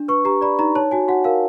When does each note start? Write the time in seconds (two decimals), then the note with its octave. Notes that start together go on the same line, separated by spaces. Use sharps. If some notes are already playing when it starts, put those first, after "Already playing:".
Already playing: D4
0.08 B4 C#6
0.25 G4 A#5
0.41 D5 B5
0.59 D#4 A#5
0.75 C#5 A5
0.91 F#4 G#5
1.08 F#4 F#5
1.24 A#4 F5